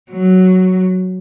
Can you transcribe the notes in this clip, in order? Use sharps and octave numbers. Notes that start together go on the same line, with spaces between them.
F#3